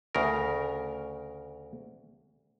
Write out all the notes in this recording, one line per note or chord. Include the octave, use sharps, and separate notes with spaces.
D2 C#3 A#4